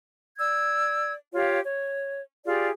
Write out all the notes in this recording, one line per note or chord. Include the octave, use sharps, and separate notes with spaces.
D5 E6 G#6
F4 G4 C#5 F5
C#5
F4 G4 G#4 D5